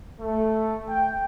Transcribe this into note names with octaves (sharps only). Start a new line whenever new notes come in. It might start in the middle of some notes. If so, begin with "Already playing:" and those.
A3
G5